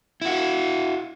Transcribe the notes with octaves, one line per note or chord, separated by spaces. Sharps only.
E4 F#4